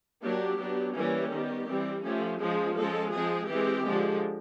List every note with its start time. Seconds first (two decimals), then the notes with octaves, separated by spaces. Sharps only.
0.23 F#3 A#3 D4 G4
0.59 F#3 B3 D4
0.95 E3 G3 A#3 C#4 G4
1.31 D#3 G3 B3
1.69 E3 G3 C4
2.04 F3 A3 C#4 G4
2.41 F3 G#3 C#4 G#4
2.77 F3 G#3 C#4 A4
3.13 F3 G#3 C4 G#4
3.49 E3 G#3 C4 G4
3.86 D3 F3 G#3